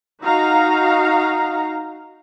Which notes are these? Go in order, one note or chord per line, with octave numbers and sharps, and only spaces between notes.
D#4 F#4 F5 A#5